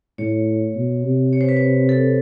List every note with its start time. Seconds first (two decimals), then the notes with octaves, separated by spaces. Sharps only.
0.18 A2 C#5
0.75 B2
1.04 C3
1.33 C#5
1.41 C5
1.49 B4
1.57 C5
1.89 A4